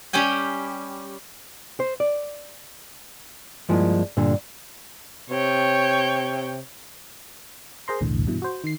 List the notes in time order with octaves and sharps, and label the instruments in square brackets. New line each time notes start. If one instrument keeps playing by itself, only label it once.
[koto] G3 C#4 G4 G5 G#5
[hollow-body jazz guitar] C5
D5
G2 F3 G#3 A#3 E4
G2 A#2 D3
[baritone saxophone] C3 [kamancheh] C#5 G5
[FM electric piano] G#4 A#4 C5 A#5 C6
B1 E2 A2 D3
G2 B2 E3
F#4 C5
D#3 C7